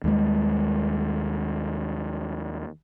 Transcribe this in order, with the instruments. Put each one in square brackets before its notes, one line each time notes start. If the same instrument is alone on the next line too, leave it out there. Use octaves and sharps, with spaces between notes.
[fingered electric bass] D#2 G3 G#3